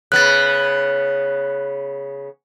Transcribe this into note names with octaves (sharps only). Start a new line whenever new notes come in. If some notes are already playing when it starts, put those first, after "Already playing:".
C#3 B3 F#6 A6